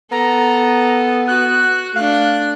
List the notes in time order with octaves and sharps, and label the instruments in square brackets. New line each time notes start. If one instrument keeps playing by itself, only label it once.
[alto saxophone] B3 [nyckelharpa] A4 [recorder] A#5
[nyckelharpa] F#4 [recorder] F#6
[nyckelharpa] A3 D4 [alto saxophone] F5 [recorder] F#6